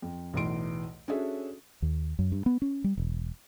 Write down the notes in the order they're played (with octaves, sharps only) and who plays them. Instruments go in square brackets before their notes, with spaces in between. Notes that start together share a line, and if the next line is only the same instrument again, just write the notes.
[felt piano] F2
B1 E2 A2 E3 C6 D7
C#4 D4 F#4 G#4 A4 E5
[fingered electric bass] D#2
F#2
G2
B3
C#4
G3
E1